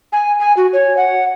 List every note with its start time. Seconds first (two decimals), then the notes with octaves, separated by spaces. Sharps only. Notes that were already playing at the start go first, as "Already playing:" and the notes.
0.13 G#5
0.40 G#5
0.57 F#4
0.73 C#5
0.97 F#5